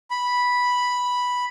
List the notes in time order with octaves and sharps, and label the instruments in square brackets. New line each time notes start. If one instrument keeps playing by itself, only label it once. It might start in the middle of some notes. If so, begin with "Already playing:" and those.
[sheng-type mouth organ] B5